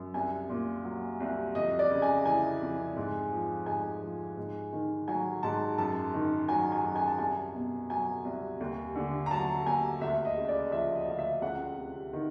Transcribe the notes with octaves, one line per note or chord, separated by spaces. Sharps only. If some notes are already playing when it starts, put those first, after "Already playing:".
Already playing: F#2
C2 G#5
A#2
F#3
C2
F2 D#5
D5
C#3
G#5
E3 G#5
F2
G#2
F3
G#2 G#5
F3
G#2
D#3
F#3 G#5
G#2 A5
F#2 A5
D#3
F#3 G#5
G#5
F#2
G#5
A5
C2 G#5
B2
F#3 G#5
C2
D#2
D3
A#5
F#3 A5
D#2 G#5
D2 E5
D#5
C#3
D5
F3 E5
D#5
D2 F5
E5
C#2 F#5
C3
D#3